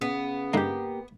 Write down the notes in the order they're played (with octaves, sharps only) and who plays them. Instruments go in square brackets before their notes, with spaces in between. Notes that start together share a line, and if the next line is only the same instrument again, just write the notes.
[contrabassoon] C#3 [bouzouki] B3
[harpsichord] G2 D3 D#4 [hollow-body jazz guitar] A#3 G4